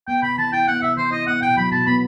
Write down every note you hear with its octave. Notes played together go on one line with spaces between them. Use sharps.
B3 G5
C3 B5
E3 A5
E4 G5
B3 F#5
C3 E5
E3 C5
E4 D#5
B3 F#5
B2 G5
F#3 B5
B2 A5
B3 B5